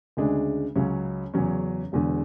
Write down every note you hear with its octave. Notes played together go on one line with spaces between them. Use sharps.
D2 C#3 G#3 D4 G#4
C#2 C#3 F#3 C#4
E2 C#3 F#3 C#4
E1 E2 D3